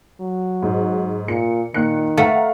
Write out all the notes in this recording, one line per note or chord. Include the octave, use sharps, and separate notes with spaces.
F#3
G#2
A#2 C#7
A#2 D#3 F#6 C#7
A3 F5 F#5 A#5